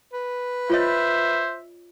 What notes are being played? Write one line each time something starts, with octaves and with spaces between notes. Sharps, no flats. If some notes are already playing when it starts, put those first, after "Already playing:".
B4
F4 C5 C#5 D#5 E5